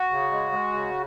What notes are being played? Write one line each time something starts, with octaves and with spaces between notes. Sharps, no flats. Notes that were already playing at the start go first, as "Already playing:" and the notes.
Already playing: F#4
C#3
G#3
G#3
C#3